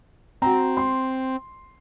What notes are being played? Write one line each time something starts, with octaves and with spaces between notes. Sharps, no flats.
C4 F#4 A#5
C6